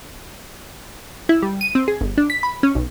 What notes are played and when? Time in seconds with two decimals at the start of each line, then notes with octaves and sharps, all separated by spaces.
1.29 E4
1.43 G3
1.61 D#7
1.75 C4
1.88 G#4
2.01 G1
2.18 D4
2.30 B6
2.43 B5
2.63 C#4
2.75 B1